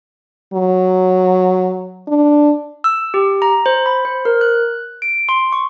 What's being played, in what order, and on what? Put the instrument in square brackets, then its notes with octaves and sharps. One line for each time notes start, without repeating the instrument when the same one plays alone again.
[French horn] F#3
D4
[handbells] E6
G4
A#5
C5
B5
C5
A#4
F#6
D7
C6
C#6